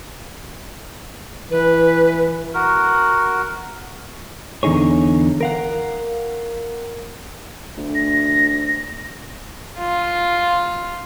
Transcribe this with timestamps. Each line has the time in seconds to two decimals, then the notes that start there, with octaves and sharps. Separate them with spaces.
1.51 E3 B4
2.54 F#4 A#4
4.63 E2 D3 D#4 G#4 C#5
5.41 A#4 F5 F#5
7.77 D2
7.95 A#6
9.79 F4